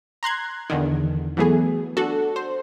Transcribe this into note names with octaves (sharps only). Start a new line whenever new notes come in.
A#5 C6 F#6 G#6
E2 D3 D#3
E3 F#3 A3 B3 G#4
D4 F#4 A4
C5